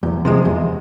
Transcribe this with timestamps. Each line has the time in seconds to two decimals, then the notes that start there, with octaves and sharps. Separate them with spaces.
0.03 E2
0.25 C3 F3 G#3
0.45 E2